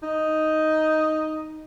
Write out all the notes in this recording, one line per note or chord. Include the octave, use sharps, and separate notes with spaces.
D#4